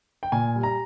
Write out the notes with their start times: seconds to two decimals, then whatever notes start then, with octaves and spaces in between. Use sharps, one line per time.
0.23 G5
0.32 A#2 G#5
0.56 G3
0.63 A#5